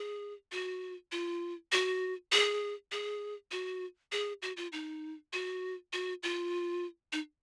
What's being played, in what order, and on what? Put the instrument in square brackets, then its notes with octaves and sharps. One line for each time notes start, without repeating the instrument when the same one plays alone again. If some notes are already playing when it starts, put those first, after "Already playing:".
Already playing: [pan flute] G#4
F#4
F4
F#4
G#4
G#4
F#4
G#4
F#4
F4
D#4
F#4
F#4
F4
D#4